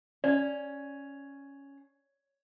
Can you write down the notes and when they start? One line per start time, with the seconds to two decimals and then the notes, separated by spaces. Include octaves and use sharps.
0.24 C#4 D5